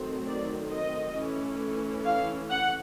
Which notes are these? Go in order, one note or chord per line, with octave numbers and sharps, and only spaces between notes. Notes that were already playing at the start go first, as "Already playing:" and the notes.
Already playing: D#3 F#3 A3 C4
D5
D#5
E3 A3 C#4
F5
F#5